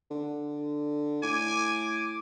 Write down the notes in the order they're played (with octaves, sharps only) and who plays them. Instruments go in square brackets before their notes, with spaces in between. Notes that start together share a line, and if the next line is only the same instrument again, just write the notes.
[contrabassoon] D3
[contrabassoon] A2 [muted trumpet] G#5 [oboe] D6